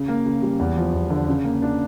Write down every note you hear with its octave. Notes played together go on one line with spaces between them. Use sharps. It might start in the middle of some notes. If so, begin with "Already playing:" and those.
Already playing: C#3
A#3
C#3
G3
E2
F3
E2
D3
C#3
A#3
D4